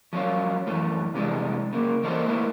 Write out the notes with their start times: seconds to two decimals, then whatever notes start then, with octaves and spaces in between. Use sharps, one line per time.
0.13 F3 F#3 C#4 F4
0.67 F#2 E3 A3
1.14 C2 F2 C3 E3 G#3 D4
1.73 C#3 A#3
2.03 E3 A#3 D#4 A4 A#4 C5
2.27 A3 A#3 E4 B4